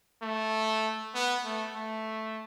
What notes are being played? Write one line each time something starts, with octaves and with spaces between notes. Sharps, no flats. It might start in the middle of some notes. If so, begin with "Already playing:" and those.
A3
B3
A3
A3